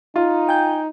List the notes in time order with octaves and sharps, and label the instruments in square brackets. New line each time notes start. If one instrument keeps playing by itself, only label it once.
[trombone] D#4 [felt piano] F4
[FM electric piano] G5 G#5 G6